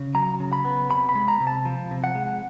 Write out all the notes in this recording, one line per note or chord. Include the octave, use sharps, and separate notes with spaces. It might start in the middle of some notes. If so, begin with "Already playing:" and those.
Already playing: C#3
F#3 A#5
C#3
B5
B3
C3 B5
B5
G#3
A#5
C3
A5
F3
C3
F#5
G#3